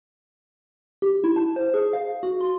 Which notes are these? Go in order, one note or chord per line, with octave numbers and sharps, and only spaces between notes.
G4
E4
A5
C5
G#4
F5
F#4
C6